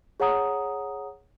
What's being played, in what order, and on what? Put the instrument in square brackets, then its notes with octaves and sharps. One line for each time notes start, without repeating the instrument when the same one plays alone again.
[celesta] G#4 C#5 F#5 A#5 D#6